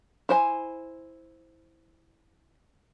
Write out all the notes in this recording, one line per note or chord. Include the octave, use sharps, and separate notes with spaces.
E4 C5 G#5